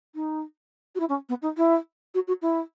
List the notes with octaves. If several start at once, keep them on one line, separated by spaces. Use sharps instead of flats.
D#4
F#4
E4
C#4
B3
D#4
E4
F#4
F#4
E4